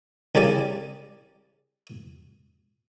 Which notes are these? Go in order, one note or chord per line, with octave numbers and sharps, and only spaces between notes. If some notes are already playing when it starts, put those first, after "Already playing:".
C2 C#3 G3 D5 D#6